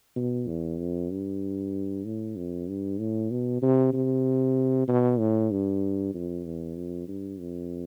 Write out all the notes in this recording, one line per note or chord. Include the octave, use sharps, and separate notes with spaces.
B2
E2
F2
G2
A2
F2
G2
A2
B2
C3
C3
B2
A2
G2
F2
E2
F2
G2
F2